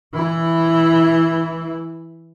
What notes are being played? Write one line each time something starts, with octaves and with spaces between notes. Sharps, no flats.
E3 E4